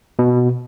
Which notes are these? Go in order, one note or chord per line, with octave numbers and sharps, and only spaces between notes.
B2